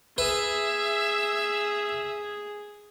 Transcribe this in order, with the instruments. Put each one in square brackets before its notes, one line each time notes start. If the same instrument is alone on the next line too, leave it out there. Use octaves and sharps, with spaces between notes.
[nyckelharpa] G#4 [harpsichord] B4 [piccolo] E5